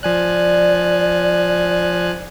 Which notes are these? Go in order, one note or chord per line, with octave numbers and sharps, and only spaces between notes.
F3 D5 G#5 F#6